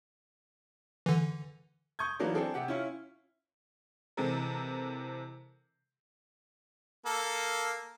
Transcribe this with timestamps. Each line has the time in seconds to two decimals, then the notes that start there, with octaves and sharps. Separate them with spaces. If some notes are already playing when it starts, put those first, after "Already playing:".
1.06 D3 E3
1.99 C#6 D#6 G6 G#6
2.19 E3 F#3 A#3 B3 D4 D#4
2.35 C4 D4 G#4 A4
2.54 C3 G4 F#5
2.68 C#4 E4 F4
4.17 C3 E3 G#3 C4 A4 A#4
7.06 A#3 A4